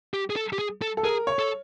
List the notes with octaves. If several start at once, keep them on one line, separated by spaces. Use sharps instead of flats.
G4
G#4
A4
G4
G#4
A4
A4
G#4 A#4
C#5
A4